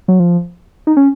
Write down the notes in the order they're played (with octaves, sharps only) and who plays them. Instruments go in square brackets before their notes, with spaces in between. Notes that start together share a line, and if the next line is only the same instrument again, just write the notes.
[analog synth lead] F#3
F3
D#4
C#4